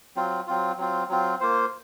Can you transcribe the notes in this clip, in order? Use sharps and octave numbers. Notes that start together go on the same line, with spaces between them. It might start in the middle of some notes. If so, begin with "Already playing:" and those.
F#3 C4 F4
F#3 C4 F4
F#3 C4 F4
F#3 C4 F4
A#3 F4 C5